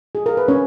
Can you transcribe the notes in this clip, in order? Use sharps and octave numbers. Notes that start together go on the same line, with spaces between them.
G#4
A#4
B4
C#4 C#5